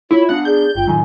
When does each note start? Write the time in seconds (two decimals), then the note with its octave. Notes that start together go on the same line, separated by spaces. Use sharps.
0.11 E4 F4 C#5
0.29 B3 D4 F5 F#5
0.45 G#4 D5 G6
0.75 G1 F4 G5
0.87 A2 D#3 F#3 G#5